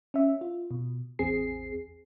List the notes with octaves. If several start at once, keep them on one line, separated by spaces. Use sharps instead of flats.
C#4 E5
F4
B2
A1 E2 C4 G#4 C7